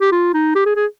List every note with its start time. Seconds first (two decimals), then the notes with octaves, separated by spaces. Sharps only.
0.01 G4
0.12 F4
0.34 D#4
0.55 G4
0.66 G#4
0.76 G#4